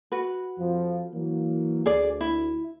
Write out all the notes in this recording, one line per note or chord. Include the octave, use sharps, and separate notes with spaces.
F#4 B4
F2 F3
E3 F#3 A#3
D2 G#4 D5
E4